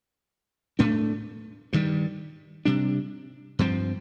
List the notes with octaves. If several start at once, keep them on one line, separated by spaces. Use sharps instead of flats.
A2 A3 D4
G2 D#3 G3
C3 G3 D4
G2 F3 C4